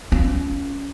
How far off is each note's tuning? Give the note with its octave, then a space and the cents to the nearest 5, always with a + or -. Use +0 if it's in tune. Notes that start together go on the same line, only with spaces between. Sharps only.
C#4 +15 F4 -10